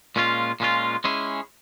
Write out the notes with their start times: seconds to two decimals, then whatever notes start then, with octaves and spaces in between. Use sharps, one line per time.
0.16 A#2 G#3 C#4 F4
0.60 A#2 G#3 C#4 F4
1.04 G#3 C#4 E4 G#4